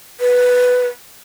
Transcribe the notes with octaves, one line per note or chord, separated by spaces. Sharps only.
B4